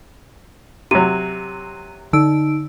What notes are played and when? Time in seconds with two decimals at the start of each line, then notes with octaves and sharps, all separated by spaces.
0.91 C3 F#3 D#7
2.13 D3 D#4 E6 D7